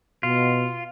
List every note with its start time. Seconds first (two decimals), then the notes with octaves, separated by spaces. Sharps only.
0.23 B2 F4